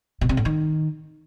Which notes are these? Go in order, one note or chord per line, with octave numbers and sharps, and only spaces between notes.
B2
C3
A2
D#3